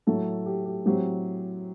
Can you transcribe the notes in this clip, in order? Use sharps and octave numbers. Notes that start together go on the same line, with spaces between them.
A2 F#3 A3 A4
G4
G4
A2 F#3 C4 G4